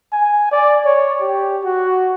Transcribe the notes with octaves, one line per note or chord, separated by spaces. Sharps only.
G#5
D5
C#5
G4
F#4